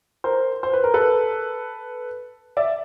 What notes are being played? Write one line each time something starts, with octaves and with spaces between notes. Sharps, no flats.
A#4 C5
C5
B4
A#4
A4 B4
D5 E5